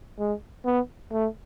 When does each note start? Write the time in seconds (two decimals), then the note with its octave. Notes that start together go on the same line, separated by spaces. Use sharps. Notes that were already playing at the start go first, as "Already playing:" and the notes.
0.19 G#3
0.65 B3
1.12 A3